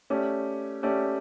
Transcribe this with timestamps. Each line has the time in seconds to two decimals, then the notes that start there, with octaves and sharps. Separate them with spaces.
0.10 A3 C#4 G4 D5
0.83 A3 C#4 G4 D5